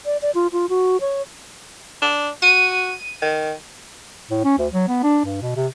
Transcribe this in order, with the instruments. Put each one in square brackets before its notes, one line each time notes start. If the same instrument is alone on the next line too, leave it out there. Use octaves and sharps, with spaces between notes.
[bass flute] D5
D5
F4
F4
F#4
C#5
[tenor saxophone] D4
[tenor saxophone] F#4 [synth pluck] D#7
[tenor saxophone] D#3
[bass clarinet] A2
C#4
D2
F#3
B3
D4
G2
B2
C3